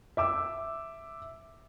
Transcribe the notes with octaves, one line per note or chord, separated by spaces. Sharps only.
E5 D6 E6